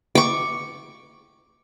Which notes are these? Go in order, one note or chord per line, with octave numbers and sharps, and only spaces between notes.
C#6 D6